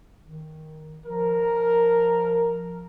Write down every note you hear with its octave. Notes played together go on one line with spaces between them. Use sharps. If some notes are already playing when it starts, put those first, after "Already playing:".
D#3
F3 A#4